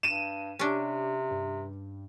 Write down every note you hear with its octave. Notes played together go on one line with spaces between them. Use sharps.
G2 D#7 E7
C3 C#4 D4 G4
G2